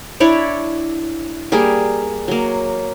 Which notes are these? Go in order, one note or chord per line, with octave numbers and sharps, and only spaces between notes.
D4 E4 C#5 D5
G3 A#3 G#4
F#3 A#3